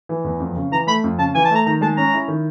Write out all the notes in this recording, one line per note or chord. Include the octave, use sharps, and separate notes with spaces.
E3
E2
F2
C#3
E3 A#5
A3 B5
F2
C#3 A5
E3 G#5
A5
A3 A#5
D#3 A#5
G#3 A5
C#4 A#5
E4
D#3